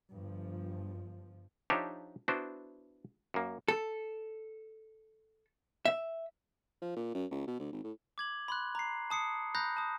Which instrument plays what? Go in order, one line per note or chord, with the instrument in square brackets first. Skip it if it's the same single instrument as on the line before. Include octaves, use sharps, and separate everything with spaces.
[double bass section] G1 G2 F3
[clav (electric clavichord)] F3 D4 D#4 G4 C#5 E5
B3 D4 E4 F#4 C5
F#2 A#3
[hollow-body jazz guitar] A4
E5
[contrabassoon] F3
A#2
F#2
C#2
B2
D2
G#1
A2
[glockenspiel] D6 G#6 F#7
B5 C6 F#6
A#5 C7
A5 D#6 C7 C#7
A#5 B5 D#6 F#6 G6 A#6
A5 D#6